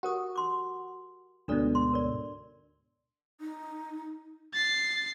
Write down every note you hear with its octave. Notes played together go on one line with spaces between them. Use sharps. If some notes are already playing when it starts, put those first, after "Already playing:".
F#4 G4 A#4 D#6
C6 D6
D2 G#2 B2 D4 A4 D5
C6
A#4 D5
D#4
A6 C7